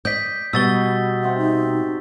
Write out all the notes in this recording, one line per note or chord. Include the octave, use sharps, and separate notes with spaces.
D5 D#5 G6 B6
B2 G3 F#4 D#5 E6 A6 G7
C3 C4 F#5
D#4